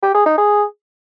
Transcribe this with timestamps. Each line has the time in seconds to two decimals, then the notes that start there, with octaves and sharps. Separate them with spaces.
0.03 G4
0.14 G#4
0.26 D#4
0.38 G#4